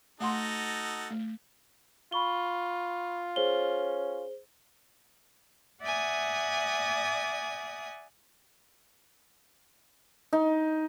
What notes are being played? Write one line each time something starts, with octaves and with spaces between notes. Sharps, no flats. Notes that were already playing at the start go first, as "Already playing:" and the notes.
A3 D#4 F#4 A4 F#5 C6
A3
F4 B5 C#6 G7
C#4 G#4 C5 G7
D5 E5 F#5 G#5 D#6
D#4